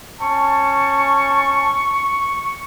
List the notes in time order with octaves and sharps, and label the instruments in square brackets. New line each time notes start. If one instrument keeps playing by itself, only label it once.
[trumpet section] C#4 A5 [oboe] C#6